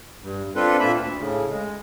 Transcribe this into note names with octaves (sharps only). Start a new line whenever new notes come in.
G2
C4 D4 F4 A4 B4
A#2 A#3 E5 B5
D2
A2 C#3
G#3